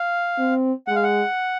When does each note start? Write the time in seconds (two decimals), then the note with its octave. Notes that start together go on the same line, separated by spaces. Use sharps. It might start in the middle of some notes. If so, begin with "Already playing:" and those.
Already playing: F5
0.38 C4
0.87 G#3 F#5
0.96 F5
1.04 F#5